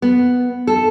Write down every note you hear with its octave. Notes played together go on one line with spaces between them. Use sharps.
B3
A4